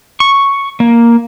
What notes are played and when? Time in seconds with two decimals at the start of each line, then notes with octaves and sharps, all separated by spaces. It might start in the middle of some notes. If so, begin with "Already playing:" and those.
0.20 C#6
0.80 A#3